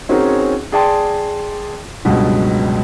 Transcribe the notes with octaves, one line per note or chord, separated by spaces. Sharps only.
C4 C#4 D#4 F#4 G#4 A#4
G#4 D5 G5 A5 C6
C#2 G2 B2 F#3